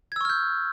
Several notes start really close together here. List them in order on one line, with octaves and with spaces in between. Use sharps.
G#6 E6 C#6 F6 G6